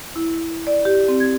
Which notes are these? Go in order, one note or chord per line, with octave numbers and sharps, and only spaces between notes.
E4
D5
G4
C4
G#6